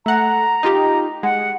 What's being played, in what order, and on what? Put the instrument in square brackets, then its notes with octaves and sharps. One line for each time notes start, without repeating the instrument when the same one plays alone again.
[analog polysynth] A3 F#5 [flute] A#5
[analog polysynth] D#4 F4 G4
[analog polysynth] G#3 [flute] F#5